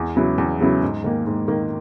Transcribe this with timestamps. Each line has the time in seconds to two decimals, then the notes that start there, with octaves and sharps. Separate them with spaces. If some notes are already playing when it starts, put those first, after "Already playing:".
Already playing: E2
0.16 C#3 F#3 B3 E4
0.38 E2
0.61 C#3 F#3 B3 E4
0.82 G#2
1.04 D#3 A#3
1.26 G#2
1.48 D#3 A#3